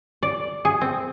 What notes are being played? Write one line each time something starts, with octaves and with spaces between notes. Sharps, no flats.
D5
G#4
C4